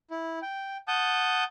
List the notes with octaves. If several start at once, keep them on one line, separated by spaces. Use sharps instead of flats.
E4
G5
F#5 A5 D#6 G6